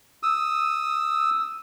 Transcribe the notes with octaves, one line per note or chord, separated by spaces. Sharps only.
D#6 E6